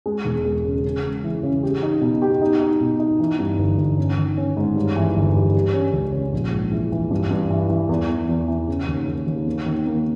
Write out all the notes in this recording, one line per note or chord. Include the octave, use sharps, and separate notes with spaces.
G#3
E1
G#3
C#3
C#3
G#3
E3
C#3
G4
D#4
B2
G4
D#4
D#4
B2
D#4
E3
G2
G1
G1
C#4
D#3
C#4
G#2
G2
E3
G1
G3
G3
C#4
C#2
C#4
A#1
G#2
E3
E3
G2
G2
E3
E3
E2
E2
E2
E3
C#3
D#2
D#2
D#2
A#3
D#3
A#3